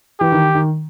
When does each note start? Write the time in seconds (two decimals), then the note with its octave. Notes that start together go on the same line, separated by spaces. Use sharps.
0.20 E3 G4
0.32 D#3
0.55 D#3